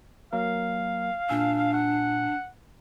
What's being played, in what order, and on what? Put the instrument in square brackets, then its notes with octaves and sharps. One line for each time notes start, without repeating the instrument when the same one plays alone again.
[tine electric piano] F#3 A#3 A#4 [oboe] F5
[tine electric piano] A#2 G#5 E6 [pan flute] D4
[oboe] F#5